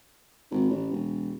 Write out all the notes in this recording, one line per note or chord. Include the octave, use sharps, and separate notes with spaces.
G#1
A1
E1